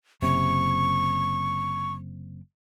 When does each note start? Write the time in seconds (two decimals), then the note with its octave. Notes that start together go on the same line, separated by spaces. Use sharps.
0.22 F#1 C3 C#6